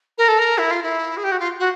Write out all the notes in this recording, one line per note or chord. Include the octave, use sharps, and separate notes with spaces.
A#4
A4
A#4
E4
F4
E4
G#4
G4
F#4
F4
F#4